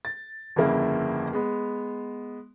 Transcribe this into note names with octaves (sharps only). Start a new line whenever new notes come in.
A6
G1 F2 C#3 A#3 E4
G#3 B3